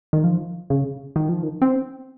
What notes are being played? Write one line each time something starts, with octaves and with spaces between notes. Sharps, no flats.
D#3
F3
C#3
D#3
F3
D#3
C4